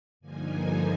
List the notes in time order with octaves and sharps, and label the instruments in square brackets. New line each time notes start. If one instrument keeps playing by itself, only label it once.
[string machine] G2 D3 F3 A#3 D#4 G#5